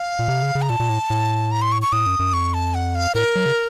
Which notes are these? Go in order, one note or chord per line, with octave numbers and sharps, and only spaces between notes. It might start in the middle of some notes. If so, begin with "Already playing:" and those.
Already playing: F5
A#2
C3
C#3
C#3
A#5
A#2 A5
A#2
A2
A2
A#5
C6
C#6
C#6
A2 D#6
F#2
F#2
F2 C#6
A5
F#5
F5
A2 A#4
F#3
C#3